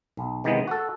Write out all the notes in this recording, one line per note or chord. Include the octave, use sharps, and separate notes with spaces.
B1
C3 D#3 E3 G#3 B3
F#4 A4